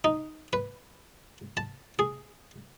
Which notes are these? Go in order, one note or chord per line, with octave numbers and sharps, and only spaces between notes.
D#4
B4
A5
G#4